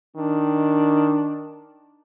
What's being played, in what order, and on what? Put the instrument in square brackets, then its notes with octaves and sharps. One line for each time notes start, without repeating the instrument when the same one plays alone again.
[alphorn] D#3 [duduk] D4